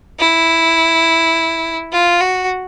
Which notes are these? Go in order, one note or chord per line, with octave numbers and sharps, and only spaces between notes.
E4
F4
F#4